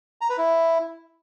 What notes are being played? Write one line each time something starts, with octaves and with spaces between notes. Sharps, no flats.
A#5
B4
E4